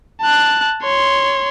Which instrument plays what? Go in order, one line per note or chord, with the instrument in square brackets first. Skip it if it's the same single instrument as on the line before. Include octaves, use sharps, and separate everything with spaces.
[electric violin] A5 F#6
C#5 C6